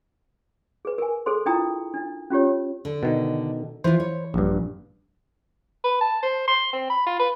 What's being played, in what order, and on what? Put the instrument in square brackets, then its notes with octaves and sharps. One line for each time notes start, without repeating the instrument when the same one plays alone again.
[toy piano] G#4 B4
A#4 G#5
G#4 A4 C5 C6
D4 E4 F4 G5 A#5 D#6
D4 D#4
C#4 F4 G4 C#5
[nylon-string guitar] D3
[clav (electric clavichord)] B2 D#3
[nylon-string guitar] E3 F4 [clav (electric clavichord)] C5
[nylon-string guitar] C#5
[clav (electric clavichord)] A#1 G2
[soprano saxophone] B4
A5
C5
C6
C4
B5
F4
B4